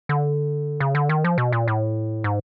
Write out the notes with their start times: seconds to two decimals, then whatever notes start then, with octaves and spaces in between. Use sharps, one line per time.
0.09 D3
0.80 C#3
0.95 D3
1.09 D#3
1.24 F3
1.38 B2
1.52 A#2
1.68 A2
2.24 G#2